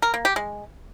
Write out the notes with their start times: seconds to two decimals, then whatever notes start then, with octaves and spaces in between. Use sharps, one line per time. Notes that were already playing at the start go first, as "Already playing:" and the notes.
0.02 A#4
0.14 A#3
0.25 G4
0.36 G#3